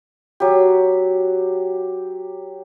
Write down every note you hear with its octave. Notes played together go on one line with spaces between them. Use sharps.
F#3 G4